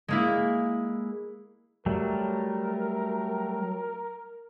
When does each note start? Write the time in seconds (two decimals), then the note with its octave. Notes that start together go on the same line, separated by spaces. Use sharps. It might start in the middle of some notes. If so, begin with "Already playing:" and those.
0.08 G#3 A#3 E4
1.86 F#3 G3 A3 A#4